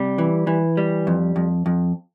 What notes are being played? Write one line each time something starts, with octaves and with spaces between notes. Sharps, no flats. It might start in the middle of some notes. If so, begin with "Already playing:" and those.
Already playing: C3 G3
E3
E3
G3
F2
F2
F2